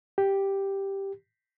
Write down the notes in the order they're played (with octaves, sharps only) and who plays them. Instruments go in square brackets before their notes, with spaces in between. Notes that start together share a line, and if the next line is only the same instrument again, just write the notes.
[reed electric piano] G4